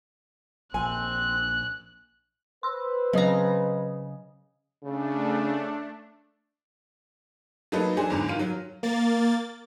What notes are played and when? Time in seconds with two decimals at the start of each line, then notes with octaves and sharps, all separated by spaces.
0.74 A#1 C4 G#5 F#6
2.63 B4 C5 C6 E6
3.13 C#3 F#3 D#5 A#5 D#6
4.83 C#3 A3 D4
7.72 F#3 A3 A#3 D#4 A4 B4
7.97 F#3 D4 G#4 C5
8.10 E2 G#2 D3
8.28 D#3 F4 D#7
8.39 F#3
8.83 A#3 A6